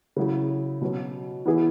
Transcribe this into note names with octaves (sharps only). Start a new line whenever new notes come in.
C#3 F#3 E4 G#4
B2 F#3 C#4
E3 B3 E4 G#4